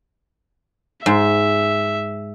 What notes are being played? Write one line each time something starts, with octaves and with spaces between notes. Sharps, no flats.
G#2 E5